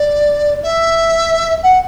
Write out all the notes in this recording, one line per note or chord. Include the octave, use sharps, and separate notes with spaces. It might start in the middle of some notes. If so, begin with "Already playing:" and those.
Already playing: D5
E5
F#5